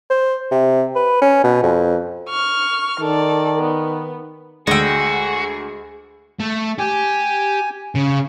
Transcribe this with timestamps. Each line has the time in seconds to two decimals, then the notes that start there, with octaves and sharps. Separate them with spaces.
0.10 C5
0.51 C3
0.95 B4
1.22 C#4
1.44 B2
1.63 F2
2.29 C#6 F6
3.00 D#3 A4 D5
3.59 B3
4.67 D2 G#3 F#4 G#4 G5 E6
6.40 A3
6.79 G4 G#5
7.95 C#3